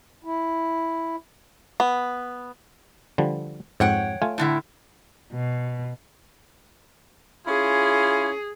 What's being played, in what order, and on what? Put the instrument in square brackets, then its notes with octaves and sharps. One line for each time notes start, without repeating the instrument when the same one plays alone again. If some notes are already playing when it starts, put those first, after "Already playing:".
[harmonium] E4
[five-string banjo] B3
[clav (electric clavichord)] D3 F3 G3
[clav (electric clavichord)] F2 G#2 [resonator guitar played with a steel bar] C#5 F#5 G5
[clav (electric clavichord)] A3 F4 G#5
[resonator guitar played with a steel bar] A2 D3 E4
[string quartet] B2
[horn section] C#4 E4 F4 [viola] G#4